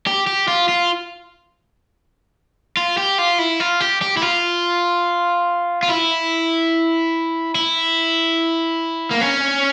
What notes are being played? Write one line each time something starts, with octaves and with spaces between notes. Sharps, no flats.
G4
G4
F4
F4
F4
G4
F4
E4
F4
G4
G4
E4
F4
F4
E4
E4
A#3
C#4